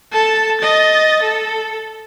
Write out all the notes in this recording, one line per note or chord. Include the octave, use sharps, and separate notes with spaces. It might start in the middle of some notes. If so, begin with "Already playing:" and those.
A4 A5
D#5 A6
A4